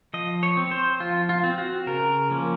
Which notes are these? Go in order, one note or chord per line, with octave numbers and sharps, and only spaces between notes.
F3 D#5
C#5
C4
C5
F3 F4
F4
C4
F#4
C#3 A#4
F3 A#3 C#4